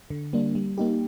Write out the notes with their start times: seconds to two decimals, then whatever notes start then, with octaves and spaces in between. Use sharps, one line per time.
0.10 D3
0.33 G3 A#3 D4
0.55 G3
0.78 A#3 D#4 G4